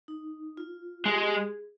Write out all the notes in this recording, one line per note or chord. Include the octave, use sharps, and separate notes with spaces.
D#4
F4
G#3 G4
G#4